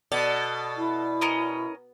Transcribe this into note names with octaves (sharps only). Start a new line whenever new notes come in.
B2 A4 D5
E4
C#4 A#4 D#5